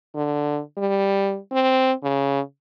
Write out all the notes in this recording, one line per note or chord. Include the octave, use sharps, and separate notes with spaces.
D3
G3
C4
C#3